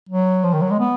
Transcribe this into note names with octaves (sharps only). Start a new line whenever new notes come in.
F#3
F3
D#3
F#3
G#3
B3